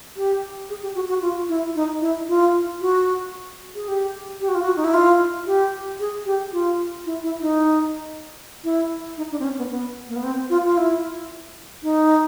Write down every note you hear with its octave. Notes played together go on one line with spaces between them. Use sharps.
G4
G#4
G4
F#4
F#4
F4
E4
D#4
E4
F4
F#4
G#4
G4
G4
F#4
F4
F#4
D#4
E4
F4
G4
G#4
G4
F4
E4
E4
D#4
E4
D#4
D4
C4
C#4
B3
B3
A#3
B3
C4
F4
F4
E4
D#4